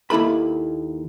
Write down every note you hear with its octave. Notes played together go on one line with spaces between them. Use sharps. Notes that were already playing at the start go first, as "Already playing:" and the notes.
D#2 A#3 E4 A4 B5